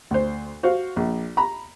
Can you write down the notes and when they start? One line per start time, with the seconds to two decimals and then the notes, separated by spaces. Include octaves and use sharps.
0.11 D2 C5
0.63 F#4 C5 F5
0.96 A#1
1.37 A#5 B5